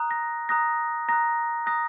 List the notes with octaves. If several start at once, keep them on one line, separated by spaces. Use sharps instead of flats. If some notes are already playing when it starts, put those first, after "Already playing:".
Already playing: A#5 D#6 F#6
A#6
A#5 D#6 F#6 A#6
A#5 D#6 F#6 A#6
A#5 D#6 F#6 A#6